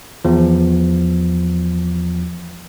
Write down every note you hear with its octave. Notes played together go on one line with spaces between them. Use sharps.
E2 F3